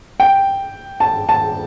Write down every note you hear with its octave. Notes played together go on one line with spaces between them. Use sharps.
G5
A5
A5